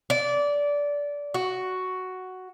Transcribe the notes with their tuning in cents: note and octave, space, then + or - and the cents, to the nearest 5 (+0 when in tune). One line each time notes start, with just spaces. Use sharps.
D5 -20
F#4 +5